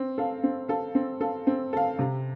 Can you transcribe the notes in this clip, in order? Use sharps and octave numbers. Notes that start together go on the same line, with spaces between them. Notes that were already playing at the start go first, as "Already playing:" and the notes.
Already playing: C4
A4 F5
C4
A4 F5
C4
A4 F5
C4
A4 F5
C3